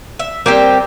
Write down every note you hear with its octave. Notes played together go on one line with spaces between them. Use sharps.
E5
G3 A#3 C4 G4